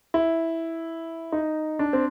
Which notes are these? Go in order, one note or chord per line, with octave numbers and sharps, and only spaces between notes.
E4
D#4
D4
C4